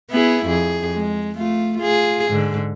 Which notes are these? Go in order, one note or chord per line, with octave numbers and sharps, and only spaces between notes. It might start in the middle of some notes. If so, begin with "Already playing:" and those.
B3 E4 G#4
F2 G#4
G#3
A3 F4
F4 G#4
G#2 D3